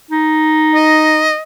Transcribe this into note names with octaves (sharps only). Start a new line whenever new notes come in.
D#4
D#5